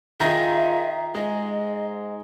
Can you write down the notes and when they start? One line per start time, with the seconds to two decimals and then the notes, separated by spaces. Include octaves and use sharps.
0.20 D#3 D#4 F4 G#4 E5 A#5 A#6
1.15 G#2 G#3 D#5